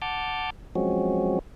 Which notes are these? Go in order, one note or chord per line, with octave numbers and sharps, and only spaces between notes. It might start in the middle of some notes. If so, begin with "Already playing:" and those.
F#5 A5 D6 F6 G6
F3 F#3 G#3 C4 C#4 F#4